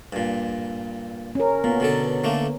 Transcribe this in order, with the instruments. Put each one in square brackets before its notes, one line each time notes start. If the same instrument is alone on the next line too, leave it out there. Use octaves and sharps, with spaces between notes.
[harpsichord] G2 A#2
[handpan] C#4 A#4
[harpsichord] A#2 [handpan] B3
[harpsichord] B2 D3 A4
D3 A3 A#3